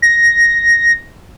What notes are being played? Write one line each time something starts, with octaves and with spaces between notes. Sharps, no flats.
A#6